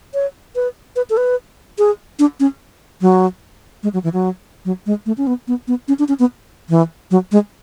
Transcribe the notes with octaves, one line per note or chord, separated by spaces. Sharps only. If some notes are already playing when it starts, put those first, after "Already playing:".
C#5
B4
B4
A4
B4
G#4
D4
C#4
F#3
G#3
F#3
E3
F#3
F#3
G#3
A3
C#4
B3
B3
B3
C#4
D4
C#4
B3
E3
F#3
G#3